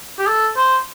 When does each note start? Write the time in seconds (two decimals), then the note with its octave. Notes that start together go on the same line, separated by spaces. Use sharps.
0.19 G4
0.27 A4
0.57 C5